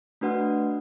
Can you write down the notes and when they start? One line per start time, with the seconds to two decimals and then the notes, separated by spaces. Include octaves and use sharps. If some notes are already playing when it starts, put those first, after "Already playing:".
0.21 A3 D4 F#4 B4 F#5